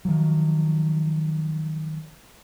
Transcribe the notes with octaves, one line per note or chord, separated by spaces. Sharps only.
D#3 F3 F#3